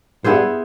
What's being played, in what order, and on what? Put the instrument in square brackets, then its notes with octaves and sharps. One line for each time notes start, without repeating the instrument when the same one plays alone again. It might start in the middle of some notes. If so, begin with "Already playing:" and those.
[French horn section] G2 [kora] B3 E4 G#4 C5